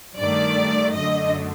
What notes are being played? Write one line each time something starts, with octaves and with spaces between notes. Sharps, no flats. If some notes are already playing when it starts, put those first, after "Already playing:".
G2 D#3 A3 D5
F#2 D3 A3 D#5